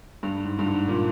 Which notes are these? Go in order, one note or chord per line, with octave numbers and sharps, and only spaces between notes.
G2
G#2
G2
G#2
A#2